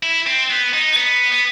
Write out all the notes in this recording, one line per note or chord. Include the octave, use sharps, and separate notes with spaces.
E4
C4
B3
D#4
B3
B3